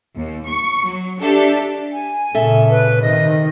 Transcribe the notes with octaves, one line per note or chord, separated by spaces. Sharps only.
D#2
C#6
F#3
D4 G4 A4 E5
G#5
A#2 C#3 A4 E5
B4
C3 D#3 D#5